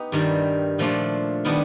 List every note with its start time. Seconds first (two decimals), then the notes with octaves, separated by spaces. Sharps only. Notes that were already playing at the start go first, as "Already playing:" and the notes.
Already playing: B3 D#4 G4
0.12 G2 D#3 G3
0.79 A#2 F3 A3 D4 F4
1.45 D#3 G3 B3 D4